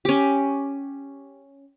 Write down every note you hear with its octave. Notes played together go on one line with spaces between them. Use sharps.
C#4 G4